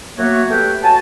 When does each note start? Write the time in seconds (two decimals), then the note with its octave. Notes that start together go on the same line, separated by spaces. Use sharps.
0.17 F#3 A#3 B3 F#4 C#5 E5
0.49 A3 G4 B4 G5
0.83 F#4 C#5 G#5 A5